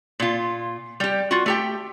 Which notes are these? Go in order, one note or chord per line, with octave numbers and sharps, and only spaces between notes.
A#2 F4
G3 G4
F4 F#4
A3 G4 G5